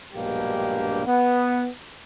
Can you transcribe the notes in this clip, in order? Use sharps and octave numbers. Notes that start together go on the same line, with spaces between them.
A#1 G2 B2 G#3 A#3 G4
B3